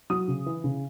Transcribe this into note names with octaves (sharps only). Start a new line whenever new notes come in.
F#3 D#6
C#3
E3
C#3